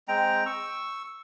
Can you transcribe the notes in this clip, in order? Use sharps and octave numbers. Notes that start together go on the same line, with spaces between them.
G#3 C4 G5 A#5
C#6 E6